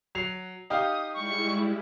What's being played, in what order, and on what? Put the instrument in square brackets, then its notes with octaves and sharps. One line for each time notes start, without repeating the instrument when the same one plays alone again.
[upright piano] F#3 C7 F7
[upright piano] D#4 G4 F5 [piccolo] D#6
[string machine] G3 G#3 E4 [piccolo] C#6